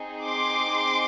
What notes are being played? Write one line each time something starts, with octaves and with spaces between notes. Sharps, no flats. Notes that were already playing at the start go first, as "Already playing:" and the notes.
Already playing: C4 D#4 G#4
C6 D6